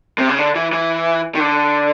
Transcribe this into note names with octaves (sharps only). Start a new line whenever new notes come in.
C3
C#3
D3
E3
E3
D#3
D3